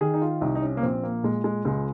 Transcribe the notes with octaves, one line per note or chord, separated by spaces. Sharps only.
D#3 G#4
D#4
F4
C2 D#4
D#4
C#4
A#3
A#1 C4
A#3
A#2 G#3
G#3
C#2 G#3